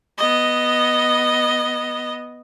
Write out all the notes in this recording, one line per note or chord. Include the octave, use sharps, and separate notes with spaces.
B3 D#5